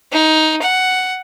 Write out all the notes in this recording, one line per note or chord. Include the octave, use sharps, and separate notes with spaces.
D#4
F#5